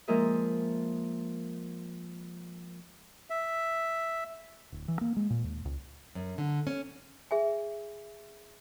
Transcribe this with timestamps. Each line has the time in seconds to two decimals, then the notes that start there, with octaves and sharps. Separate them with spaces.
0.08 F3 G#3 A#3 A#4 D#5 E5
3.30 E5
4.72 D1
4.88 E3
5.01 A#3
5.16 G#3
5.30 A#2
5.44 D#2
5.65 C#2
6.15 F#2
6.38 D3
6.67 C#4
7.31 G#4 E5 G#5